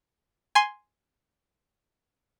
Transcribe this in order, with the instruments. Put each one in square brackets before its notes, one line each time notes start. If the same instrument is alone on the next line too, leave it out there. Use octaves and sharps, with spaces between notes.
[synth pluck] G#5 C6